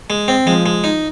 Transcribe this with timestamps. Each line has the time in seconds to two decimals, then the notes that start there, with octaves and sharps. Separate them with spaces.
0.10 G#3
0.28 C4
0.46 F3 G#3
0.66 G#3
0.84 D#4